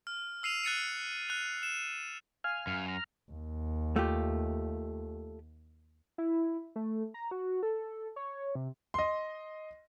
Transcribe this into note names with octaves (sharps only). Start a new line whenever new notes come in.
F6
E6 C7 D#7 F7
F#6 A6 C#7 D#7
F#6 F7
E7
F5 G#5 F6
F#2
A#5 F6
D#2
A3 F4 G4
E4
A3
A#5
F#4
A4
C#5
C3
D#5 C6